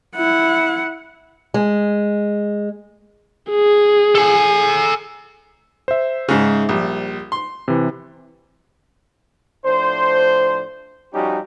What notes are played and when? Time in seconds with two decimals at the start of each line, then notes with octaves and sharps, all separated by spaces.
0.16 E4 F#5
1.54 G#3
3.51 G#4
4.15 A4 G#5
5.88 C5 E5
6.29 G#2 C#3
6.69 A#1 G3
7.32 C6
7.68 C3 E3
9.65 A2 F3 D4 C5
11.13 F3 G3 C#4 D#4 F#4 G4